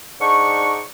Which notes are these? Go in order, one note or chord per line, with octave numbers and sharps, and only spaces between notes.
G#2 D4 D#4 D5 C#6